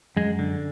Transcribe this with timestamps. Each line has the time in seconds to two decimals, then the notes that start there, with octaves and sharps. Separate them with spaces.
0.17 F#2 G#3
0.39 D3